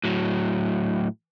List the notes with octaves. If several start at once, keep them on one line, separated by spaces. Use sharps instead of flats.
A2 F#3